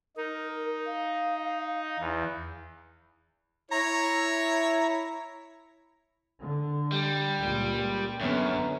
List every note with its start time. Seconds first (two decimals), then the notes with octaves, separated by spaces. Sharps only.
0.17 D#4 A#4
0.86 F5
1.99 E2
3.71 E4 C#5 A#5
6.41 D3
6.92 G3
7.38 C#2 A#2
8.21 F#2 D3 B3 C#4